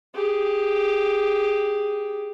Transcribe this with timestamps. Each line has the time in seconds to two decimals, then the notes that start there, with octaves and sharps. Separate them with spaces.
0.15 G4 G#4